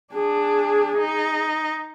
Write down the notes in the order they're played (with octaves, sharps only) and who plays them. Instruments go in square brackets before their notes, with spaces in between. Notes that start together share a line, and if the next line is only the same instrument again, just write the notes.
[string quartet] D4 [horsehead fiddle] G#4
[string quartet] D#4